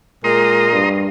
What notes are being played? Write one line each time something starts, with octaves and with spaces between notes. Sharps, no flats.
A#2 G#3 A#5 C6 D#6
G2